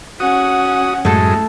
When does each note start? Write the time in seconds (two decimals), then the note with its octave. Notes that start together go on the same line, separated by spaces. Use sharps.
0.20 C#4 F#4 F#5 D#6
1.05 F#2 A2 G#3 A3 A4